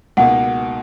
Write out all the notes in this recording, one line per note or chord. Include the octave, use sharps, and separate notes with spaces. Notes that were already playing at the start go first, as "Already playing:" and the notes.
C#2 B2 A#3 D#4 F#5